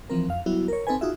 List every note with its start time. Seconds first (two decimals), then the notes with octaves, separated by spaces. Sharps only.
0.10 E3 F3 C4 A#4
0.28 F2 F5
0.46 F#3 G3 B3 E4 F#4
0.68 A#4 C#5
0.87 C4 D#4 A4 B4 G#5
1.01 D#4 F4 F#4 G#4 E5